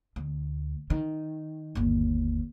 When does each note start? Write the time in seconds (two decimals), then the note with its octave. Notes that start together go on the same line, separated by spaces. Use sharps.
0.16 D2
0.90 D#3
1.75 G1 D#2